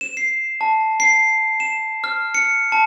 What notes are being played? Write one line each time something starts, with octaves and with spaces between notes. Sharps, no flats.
E7
C7
A5
C7
E7
F6
C#7
A5